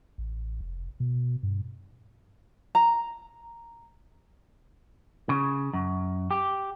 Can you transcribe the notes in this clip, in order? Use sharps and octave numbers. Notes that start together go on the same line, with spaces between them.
A1
F1
B2
G2
A#5
C#3
F#2
G4